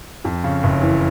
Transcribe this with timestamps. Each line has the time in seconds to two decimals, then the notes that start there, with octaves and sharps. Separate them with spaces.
0.25 F2
0.44 C#3
0.63 F#1
0.82 E3